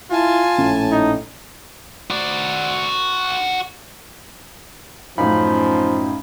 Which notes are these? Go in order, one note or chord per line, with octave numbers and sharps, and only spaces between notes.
E4 F4 G#5 A5
A#1 A2 C#4
D#4
F#4 D5
F#2 A2 F3 C#4 D#4 F5 B5